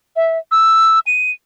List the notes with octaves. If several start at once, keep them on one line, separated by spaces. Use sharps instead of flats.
E5
E6
D#7